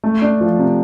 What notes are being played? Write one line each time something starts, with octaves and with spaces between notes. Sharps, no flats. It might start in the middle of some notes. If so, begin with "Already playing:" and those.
A3
D4
F3
C3